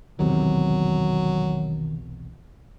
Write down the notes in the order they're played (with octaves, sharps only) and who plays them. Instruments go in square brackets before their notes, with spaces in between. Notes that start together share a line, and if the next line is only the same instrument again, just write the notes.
[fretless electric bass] B1 E2 C3 [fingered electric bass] D#3 [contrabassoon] F#3